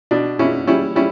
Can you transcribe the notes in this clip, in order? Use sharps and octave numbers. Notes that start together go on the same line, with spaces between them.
B2 D4
B2 C#4 E4
G3 C#4 E4
G3 C#4 E4